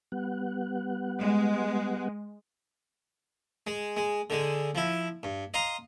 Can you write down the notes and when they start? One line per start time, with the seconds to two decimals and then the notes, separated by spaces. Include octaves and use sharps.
0.12 G3 B3 F#5
1.21 G#3
3.67 G#3
3.97 G#3
4.30 D3 G#3
4.75 F3 E4
5.23 G2
5.54 D#5 F5 A#5 C6